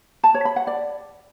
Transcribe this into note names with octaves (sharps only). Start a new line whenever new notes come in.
A5
C#5
B5
F#5
D5